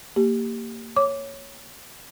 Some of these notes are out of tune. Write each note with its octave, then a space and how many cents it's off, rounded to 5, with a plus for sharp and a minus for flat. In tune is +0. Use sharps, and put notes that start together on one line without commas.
A#3 -20 G4 +0
C#5 +0 D6 -15